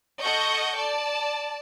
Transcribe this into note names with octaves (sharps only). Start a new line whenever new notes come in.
A4 D#5 F#5 C#6 G6
D5 A5